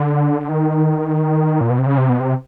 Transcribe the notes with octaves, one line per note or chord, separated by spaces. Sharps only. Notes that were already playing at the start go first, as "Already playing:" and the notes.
Already playing: D3
D#3
A#2
B2
C3
C#3
C3
B2
C3